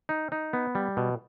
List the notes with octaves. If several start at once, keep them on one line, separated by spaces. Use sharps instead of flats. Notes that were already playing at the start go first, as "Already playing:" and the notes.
D#4
D#4
B3
G3
B2